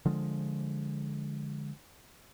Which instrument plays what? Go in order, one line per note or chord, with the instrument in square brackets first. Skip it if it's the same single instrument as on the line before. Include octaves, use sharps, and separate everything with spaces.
[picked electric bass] D3 F3 G#3